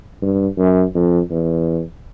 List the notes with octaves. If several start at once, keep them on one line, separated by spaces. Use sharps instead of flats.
G2
F#2
F2
E2